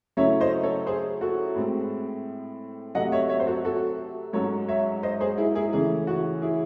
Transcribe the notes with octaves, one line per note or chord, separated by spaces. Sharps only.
C#3 F#3 A3 C#4 E4 C#5 E5
C5 D#5
A4 C#5
G#4 C5
F#4 A4
A2 G#3 C4
C3 F#3 A3 D#5 F#5
C#5 E5
C#5 E5
C5
F#4 A4
F#4 A4
G#2 F#3 C#4 A4 C#5
C#5 E5
C5 D#5
G#4 C5
E4 G#4
E4 G#4
C#3 E3 A3 C#4 E4 G#4
F#4
E4 G#4